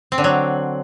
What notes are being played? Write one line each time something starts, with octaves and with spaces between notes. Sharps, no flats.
C4
D3
F#3